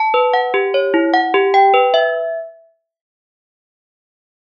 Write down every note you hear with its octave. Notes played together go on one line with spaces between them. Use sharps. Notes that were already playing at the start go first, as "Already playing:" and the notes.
Already playing: A5
B4
F#5
G4
C#5
E4
F#5
G4
G5
B4
E5